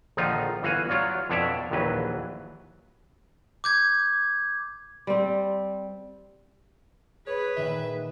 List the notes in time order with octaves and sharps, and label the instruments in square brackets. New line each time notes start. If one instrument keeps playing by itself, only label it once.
[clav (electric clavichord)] A#1 D3 D#3 F3 D#4 F4
G1 E3 F#4 F5 F#5 G#5
F#3 F4 C#5 D5 F5
F2 B2 D4 C#5 D5 E5
A#1 D#2 E3 F#3 B4
[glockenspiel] D6 G6 G#6
[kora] G3 C4
[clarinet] G#4 [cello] B4 [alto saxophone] C#5
[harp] A#2 D#3 [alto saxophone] E5